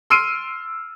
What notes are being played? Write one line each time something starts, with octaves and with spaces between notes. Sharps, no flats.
C6 E6 F6 C7 D7 D#7